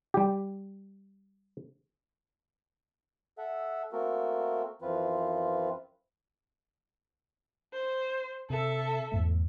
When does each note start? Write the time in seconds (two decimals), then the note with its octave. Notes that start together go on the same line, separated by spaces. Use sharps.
0.14 G3 G4
3.38 A4 E5 F#5
3.92 A3 A#3 C4 F#4 A4 A#4
4.82 F#2 E3 F3 C4 F4 B4
7.73 C5
8.50 C3 A4 E5
9.12 E2 G#2 A3